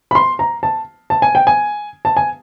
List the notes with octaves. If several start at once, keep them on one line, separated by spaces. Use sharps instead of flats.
B5
C6
A#5
A5
A5
G#5
G5
G#5
A5
G#5